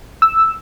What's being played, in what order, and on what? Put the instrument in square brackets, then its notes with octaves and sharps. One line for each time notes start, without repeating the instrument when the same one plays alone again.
[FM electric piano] E6